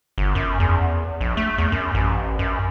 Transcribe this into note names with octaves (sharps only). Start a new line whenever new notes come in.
G1
F#2
E2
A#1
A3
E2
F#2
A1
F#2